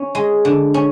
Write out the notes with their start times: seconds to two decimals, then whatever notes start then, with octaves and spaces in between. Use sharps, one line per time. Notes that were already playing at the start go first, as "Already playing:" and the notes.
Already playing: C#4
0.15 G#3
0.45 D3
0.74 C#4